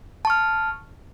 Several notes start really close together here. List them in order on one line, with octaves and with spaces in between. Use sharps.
A5 C#6 F6